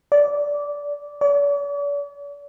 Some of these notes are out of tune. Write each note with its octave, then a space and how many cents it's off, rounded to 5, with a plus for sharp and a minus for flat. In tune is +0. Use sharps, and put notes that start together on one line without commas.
D5 -15
D5 -45